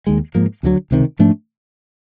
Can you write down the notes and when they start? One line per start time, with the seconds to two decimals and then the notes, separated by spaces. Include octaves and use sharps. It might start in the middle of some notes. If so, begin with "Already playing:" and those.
0.07 D#2 D#3 G#3
0.35 G#2 F3 A#3
0.63 D2 D3 F#3
0.91 C#2 C3 D#3
1.19 G#2 F3 A3 D4